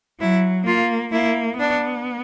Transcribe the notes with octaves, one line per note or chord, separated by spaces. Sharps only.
F#3 E4
A#3 F4
A#3 E4
B3 D4